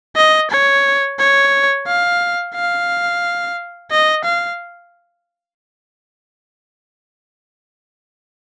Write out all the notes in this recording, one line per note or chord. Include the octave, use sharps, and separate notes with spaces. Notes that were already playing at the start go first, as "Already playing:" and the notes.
D#5
C#5
C#5
F5
F5
D#5
F5